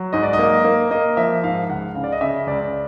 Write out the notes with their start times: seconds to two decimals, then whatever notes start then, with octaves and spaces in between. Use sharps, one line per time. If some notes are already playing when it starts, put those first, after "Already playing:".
Already playing: F#3
0.13 G#2 D#5
0.23 D5
0.33 D#5
0.39 A#3
0.64 A#3
0.91 A#3 D#5
1.17 F3 E5
1.43 G#2 F5
1.69 C#2 F#5
1.95 C#3 F5
2.04 D5
2.12 D#5
2.21 C#3 E5
2.47 C#2 D5